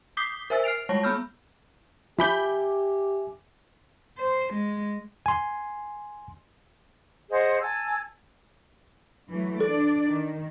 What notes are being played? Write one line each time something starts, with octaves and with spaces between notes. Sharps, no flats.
D6 D#6 G6 B6 C7 G7
A#4 C5 E5 G#5 E6 A6
F6 C7 D7 F7
G3 G#3 C#5 A5 C#6 A#6
B3 B5 E6 F6 G6
F3 G4 E5 G#5 B5 D6 G6
C5
G#3
G#5 C6
G#4 C5 D#5 F#5
G#5 A5 E6 G#6
E3 F#3 A3
D4 A4 D5
D#3